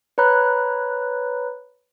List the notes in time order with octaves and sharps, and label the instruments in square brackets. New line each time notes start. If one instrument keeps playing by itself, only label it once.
[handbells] B4 C#5 A#5 B5 F#6